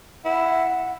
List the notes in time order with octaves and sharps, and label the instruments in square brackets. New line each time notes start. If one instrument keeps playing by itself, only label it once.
[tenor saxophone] E4 [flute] F#5